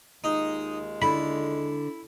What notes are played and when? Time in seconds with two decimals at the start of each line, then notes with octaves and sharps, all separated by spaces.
0.24 D#2 G#3 D#4 F4
1.02 D3 E4 B5